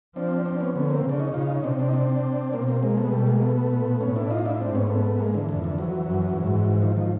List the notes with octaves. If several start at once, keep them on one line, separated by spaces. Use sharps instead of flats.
F3 C4 D4
C4 D4
B3 C#4
D3 B3 C#4
A#3 C4
C#3 D4
C#4 D#4
C#3 D#4 F4
C#4 D#4
C3 C4 D4
C4 D4
D#4
C4 D4
B2 A#3 C4
A#3 C4
G#3 A#3
A3 B3
G#3
B2 G3 A3
G#3 A#3
A3 B3
A#2
A2 B3 C#4
D4 E4
D#4 F4
D4 E4
G#2 C4 D4
B3 C#4
A3 B3
G#3 A#3
D3 E3
F2 D3 E3
D3 E3
E3 F#3
F#2
G#2
E3
D#3 F3
D#3 F3